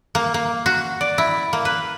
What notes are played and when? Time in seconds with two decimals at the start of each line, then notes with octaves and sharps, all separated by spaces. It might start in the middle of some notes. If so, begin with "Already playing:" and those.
0.15 A#3
0.34 A#3
0.66 F#4
1.01 D5
1.18 E4
1.53 A#3
1.65 B4